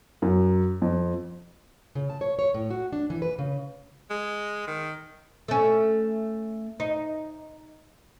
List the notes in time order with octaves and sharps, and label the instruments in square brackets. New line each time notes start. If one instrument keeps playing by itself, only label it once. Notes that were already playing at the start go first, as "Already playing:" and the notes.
[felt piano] F#2
F2
[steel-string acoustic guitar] C#3
A5
C#5
C#5
A2
F#4
D4
E3
B4
C#3
[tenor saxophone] G#3
D#3
[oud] A3 C#4
D#4